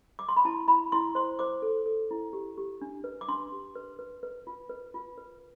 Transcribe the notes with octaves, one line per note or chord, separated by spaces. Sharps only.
D6
C6
B5
E4 A5
E4 B5
E4 C6
C5 C6
C5 D6
A4
A4
E4
G4
G4
D4
B4
D6
D4 C6
G4
B4
B4
B4
F4
B4
F4
B4